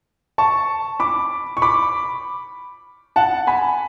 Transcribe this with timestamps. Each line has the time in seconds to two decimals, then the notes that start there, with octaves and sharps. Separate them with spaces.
0.38 A5 C#6
1.00 B5 D6
1.57 C#6
1.62 B5 D6
3.16 F#5 A5
3.47 G#5 B5